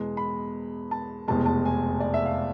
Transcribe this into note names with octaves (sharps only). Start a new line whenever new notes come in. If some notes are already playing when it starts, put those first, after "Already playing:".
Already playing: E2 B2 G#3
B5
A5
F1 E2 B2 G#3 A5
A5
G#5
D5
E5
F5